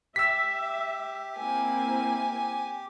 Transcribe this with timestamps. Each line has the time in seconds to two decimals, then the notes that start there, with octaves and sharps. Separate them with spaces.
0.16 G4 E5 E6 B6
1.38 A#3 C4 E4 G#5